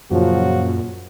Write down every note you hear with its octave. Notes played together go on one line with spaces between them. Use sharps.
F#2 A#2 C#3 F3 F#3 F#4